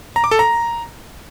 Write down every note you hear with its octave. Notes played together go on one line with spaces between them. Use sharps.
A#5
D6
A4
A#5